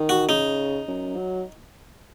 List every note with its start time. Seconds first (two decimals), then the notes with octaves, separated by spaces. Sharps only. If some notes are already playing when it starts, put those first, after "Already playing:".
Already playing: D#3
0.09 F#4
0.29 C#3 D#4
0.88 F#2
1.16 F#3